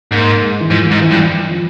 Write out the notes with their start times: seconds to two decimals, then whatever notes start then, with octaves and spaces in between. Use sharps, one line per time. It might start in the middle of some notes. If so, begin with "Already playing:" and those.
0.12 G#2 A#3
0.41 G#3
0.60 E3
0.71 G#2 F3
0.87 G#2 E3
1.01 E3
1.12 G2
1.15 E3
1.50 F3